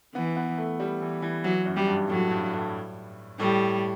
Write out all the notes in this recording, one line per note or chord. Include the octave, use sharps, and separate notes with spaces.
E3 B3
B3
A3
G3
E3
E3
E3 F#3
F#2
G3
G2
A2 F#3
G2
A2
A2 G3